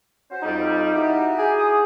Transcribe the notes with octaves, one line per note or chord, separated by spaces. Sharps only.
C#4 F#4 C5
F2 G3 D#4
E4 F#4 G4
G#4
D#6